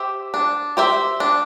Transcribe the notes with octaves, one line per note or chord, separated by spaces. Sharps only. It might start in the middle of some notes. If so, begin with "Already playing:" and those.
Already playing: G4 C5 E5
D4
G4 C5 E5
D4